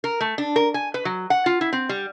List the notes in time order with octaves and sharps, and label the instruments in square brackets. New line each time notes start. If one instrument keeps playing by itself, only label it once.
[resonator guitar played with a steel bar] A#4
A3
D4
A#4
G#5
B4
F#3
F#5
F4
E4
C4
G3